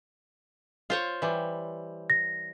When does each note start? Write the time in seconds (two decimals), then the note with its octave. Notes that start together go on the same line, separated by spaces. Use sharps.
0.90 F4 C5 C#5
1.22 E3 G3
2.10 A#6